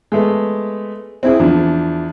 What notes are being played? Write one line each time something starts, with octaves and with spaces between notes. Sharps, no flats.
G#3 A3 B3
C4 E4 G#4
E2 F3 D4